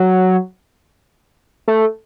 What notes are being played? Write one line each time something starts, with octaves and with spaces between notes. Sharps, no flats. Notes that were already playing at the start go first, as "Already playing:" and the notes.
Already playing: F#3
A3